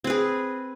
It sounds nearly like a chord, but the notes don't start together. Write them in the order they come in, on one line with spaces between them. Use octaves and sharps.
C4 B4 G#4